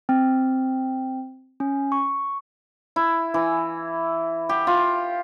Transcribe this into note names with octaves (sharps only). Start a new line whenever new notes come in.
C4
C#4
C#6
E4
E3
G4
F4